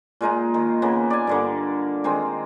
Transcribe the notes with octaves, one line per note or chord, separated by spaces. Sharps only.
A#2 G#3 D#4 F4
D#3
C#3 A#3 B3
D5 G#5
G2 D3 A#3
D#3 G#3 C4